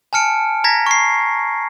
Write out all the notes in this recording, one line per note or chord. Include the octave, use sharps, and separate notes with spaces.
G#5 A5 F6 C#7 D7
A#5 G#6 A#6 B6
C#6 C7